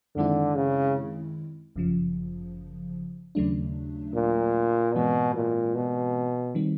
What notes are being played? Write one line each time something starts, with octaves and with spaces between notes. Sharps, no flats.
F#2 D3 D#3 G#3 C4 E4
C#3
G1 F#2 C#3 F3
D#2 C#3 F#3 A3 D4
A#2
G#2 B2 E3 G#3 C4
A#2
B2
D#3 G3 C4